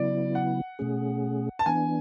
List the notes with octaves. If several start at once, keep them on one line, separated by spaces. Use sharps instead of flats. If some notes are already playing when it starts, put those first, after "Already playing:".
Already playing: C#3 F#3 B3 E4 D5
F#5
B2 A3 C#4 G#4
A5
E3 B3 D4 G#5